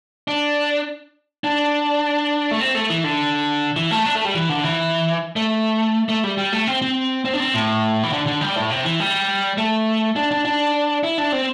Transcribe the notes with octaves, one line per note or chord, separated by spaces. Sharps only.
D4
D4
A3
C4
A3
E3
D3
E3
A3
D4
A3
G3
E3
D3
E3
A3
A3
G3
G3
A3
C4
C4
C4
D4
C4
A2
E3
D3
D3
G3
A2
C3
E3
G3
A3
D4
D4
D4
E4
D4
C4